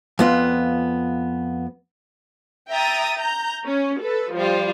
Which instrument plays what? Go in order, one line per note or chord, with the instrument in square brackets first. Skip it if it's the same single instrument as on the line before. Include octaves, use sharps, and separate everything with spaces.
[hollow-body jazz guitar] F2 B3 F4
[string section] E5 G5 A#5 D#6 A6
A#5 G6
C#4
A4 B4
F3 G3 F4